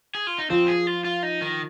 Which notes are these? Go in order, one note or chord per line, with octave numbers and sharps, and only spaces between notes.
G#4
F4
D#4
F3 C4
G#4
F4
F4
D#4
D#3